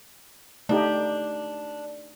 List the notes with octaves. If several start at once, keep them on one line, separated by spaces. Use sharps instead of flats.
A3 D4 D#4 G4